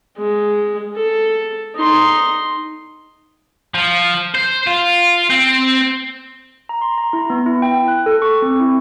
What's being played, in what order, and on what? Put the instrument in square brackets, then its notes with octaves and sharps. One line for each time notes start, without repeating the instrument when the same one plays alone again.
[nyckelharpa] G#3
A4
D#4 C6
[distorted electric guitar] F3
C5
F4
C4
[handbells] A#5
C6
A#5
E4
B3
E4
G5
F#6
A4
C#6
C4
E4